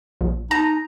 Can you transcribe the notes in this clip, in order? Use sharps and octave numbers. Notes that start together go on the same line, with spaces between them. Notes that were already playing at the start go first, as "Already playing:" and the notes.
A#1
D#4 A5 A#5